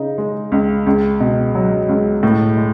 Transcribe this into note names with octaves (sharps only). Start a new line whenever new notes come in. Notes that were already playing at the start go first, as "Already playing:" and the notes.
Already playing: C#3 D#4
G#3
C#2
C#2
B2
F#3
C#2
A2
G#3